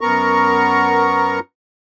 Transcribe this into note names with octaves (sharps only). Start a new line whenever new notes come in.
F#2 B3 A#4 A#5 C#6